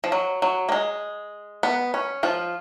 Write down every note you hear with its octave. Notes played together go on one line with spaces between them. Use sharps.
F3
F#3
F#3
A#3
G#3
B3
C#4
F3 F4